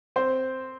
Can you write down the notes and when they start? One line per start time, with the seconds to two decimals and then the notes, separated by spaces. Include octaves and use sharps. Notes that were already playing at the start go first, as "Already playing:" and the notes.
0.16 C4 C5